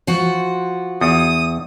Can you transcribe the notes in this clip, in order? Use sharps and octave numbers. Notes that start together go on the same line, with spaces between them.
F3 F#4
E2 D#6